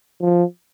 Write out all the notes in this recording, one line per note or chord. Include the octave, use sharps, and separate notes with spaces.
F3